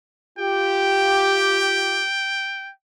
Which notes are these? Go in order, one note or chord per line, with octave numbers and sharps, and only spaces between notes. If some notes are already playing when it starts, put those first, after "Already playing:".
F4 G4 G5